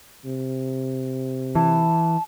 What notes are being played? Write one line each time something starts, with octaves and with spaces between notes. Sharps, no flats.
C3
E3 A5